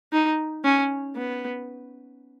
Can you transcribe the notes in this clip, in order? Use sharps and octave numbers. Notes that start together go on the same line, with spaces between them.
D#4
C#4
B3